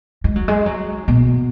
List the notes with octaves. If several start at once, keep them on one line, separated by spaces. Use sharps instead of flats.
G#3
F#3
G#3
F#3
B2